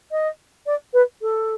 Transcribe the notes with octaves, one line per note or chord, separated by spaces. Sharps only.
D#5
D5
B4
A4